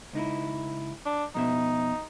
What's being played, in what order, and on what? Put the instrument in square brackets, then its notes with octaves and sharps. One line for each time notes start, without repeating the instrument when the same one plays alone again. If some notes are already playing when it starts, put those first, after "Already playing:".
[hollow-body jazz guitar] C#2 D#4 E4
[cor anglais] D4
[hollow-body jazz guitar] F2 B2 E5 [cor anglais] D#4